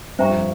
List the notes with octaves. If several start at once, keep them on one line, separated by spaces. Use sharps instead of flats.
G2 C5 E5 G5 A#5 C#6
F2